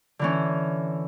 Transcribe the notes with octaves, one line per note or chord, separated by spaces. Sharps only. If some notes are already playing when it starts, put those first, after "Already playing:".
D3 E3 C#4